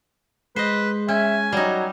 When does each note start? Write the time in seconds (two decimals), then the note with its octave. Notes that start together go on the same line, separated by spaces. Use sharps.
0.56 G#3 B4 C5 D#5
1.08 C#4 E5 G#5
1.53 F#3 G3 D#4